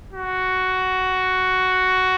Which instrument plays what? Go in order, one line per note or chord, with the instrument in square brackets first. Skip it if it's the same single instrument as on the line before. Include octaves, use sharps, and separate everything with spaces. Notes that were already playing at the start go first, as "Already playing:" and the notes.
[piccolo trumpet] F#4